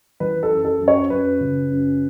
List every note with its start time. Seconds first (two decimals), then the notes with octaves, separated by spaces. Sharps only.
0.20 E3 B4
0.43 A4
0.50 F#2
0.65 A4
0.81 F#2
0.88 C#5
1.10 F#2 B4
1.41 C#3
1.70 F#2